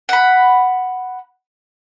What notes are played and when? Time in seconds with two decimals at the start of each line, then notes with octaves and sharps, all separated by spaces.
0.09 F#5 B5